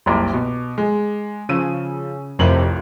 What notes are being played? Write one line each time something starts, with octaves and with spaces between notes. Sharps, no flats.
F#1 C2 D6
B2
G#3
C#3 F3 E6 D#7
A1 F2 C3 A#4 F#7